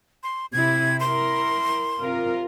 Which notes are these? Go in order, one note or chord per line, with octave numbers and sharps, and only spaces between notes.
C6
C3 E4 G#6
E4 A#4 C6
C3 F4 A#4